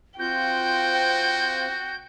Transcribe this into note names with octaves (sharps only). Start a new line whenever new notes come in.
C4 F4 F#4 C5 G5 G6